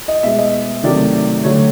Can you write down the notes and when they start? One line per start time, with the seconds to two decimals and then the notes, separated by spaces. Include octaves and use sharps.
0.08 D#5
0.23 B2 G#3 E5
0.39 D#5
0.83 C3 D#3 F#3 A3 D5
1.44 D3 F#3 A3 C#5